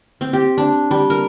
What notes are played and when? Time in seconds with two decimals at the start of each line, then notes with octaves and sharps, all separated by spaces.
0.21 C4
0.33 G4
0.58 D4
0.91 G3
1.10 A#4